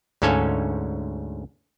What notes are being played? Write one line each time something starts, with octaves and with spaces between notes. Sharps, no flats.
D2 G#2 C#4 A4 F5 G#5